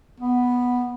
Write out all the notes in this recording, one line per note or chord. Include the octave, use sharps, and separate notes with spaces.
B3